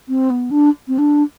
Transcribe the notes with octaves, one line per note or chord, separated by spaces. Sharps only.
C4
B3
D4
C4
D4